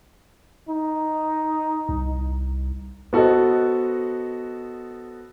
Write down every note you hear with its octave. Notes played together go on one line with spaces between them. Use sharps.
D#4
C2
B3 F#4 A4 C5 D#5